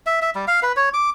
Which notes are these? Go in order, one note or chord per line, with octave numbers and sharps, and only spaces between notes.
E5
E5
G3
F5
B4
C#5
D6